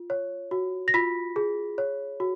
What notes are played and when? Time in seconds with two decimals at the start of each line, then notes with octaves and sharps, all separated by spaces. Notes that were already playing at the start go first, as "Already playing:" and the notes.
Already playing: F4
0.10 C#5
0.51 F#4
0.88 A#6
0.94 F4 B5 B6
1.36 G#4
1.78 C#5
2.20 F#4